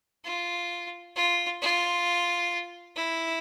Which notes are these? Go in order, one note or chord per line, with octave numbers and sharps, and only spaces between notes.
F4
F4
F4
E4